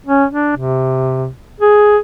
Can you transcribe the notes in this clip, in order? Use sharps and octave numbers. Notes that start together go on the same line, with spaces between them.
C#4
D4
C3
G#4